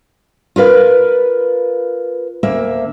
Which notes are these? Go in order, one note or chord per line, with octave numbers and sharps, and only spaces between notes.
F4 A#4 B4 F5
D2 A#3 E5